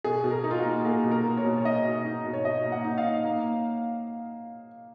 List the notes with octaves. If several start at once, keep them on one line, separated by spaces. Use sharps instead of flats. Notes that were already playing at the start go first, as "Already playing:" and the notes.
B2 G#4
B2
A#4
D#4
F4
F#4
A#3
A#3 G#4
B2
A#4
A#3
C#5
B2
C#5
D#4 D#5
B2
D#4
B2
C#5
B2 D#5
A#3
F#5
D#4
F5
D#4
A#3